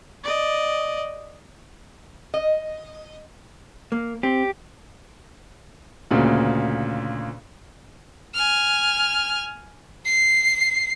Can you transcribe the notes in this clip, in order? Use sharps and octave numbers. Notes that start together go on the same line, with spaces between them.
D5 D#5
D#5
A#3
C4 G4
D2 A#2 C#3
G#5 F6
C7